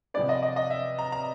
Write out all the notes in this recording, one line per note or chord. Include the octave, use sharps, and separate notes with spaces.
C3 F3 G#3 B3 D5
D#5
D#5
D#5
E5
A#5
A#5